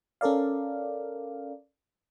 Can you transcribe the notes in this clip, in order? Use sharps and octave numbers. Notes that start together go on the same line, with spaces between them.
C#4 A4 A#4 D5 F5